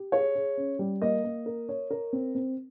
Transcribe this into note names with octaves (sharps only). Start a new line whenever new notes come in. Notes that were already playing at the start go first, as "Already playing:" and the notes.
Already playing: G4
G#4 C#5
G#4
C#4
G3
A#3 D#5
A#3
A#4
C#5
A#4
C4
C4